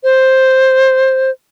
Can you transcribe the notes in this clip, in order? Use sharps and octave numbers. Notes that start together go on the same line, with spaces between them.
C5